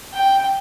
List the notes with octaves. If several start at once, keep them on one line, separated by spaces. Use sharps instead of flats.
G5